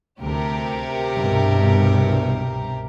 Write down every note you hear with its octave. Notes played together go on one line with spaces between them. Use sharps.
D2 C3 G4 A#4
C2 G2 B2